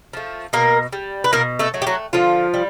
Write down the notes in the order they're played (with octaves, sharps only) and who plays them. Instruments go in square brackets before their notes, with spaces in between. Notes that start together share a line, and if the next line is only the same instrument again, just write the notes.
[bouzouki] F3 A3
B2 A#3 A#4
G3
B4
B2 A#3 A#4
A3 A4
F#3 A3
G4
F#3 F#4
D3 F3 F4
G3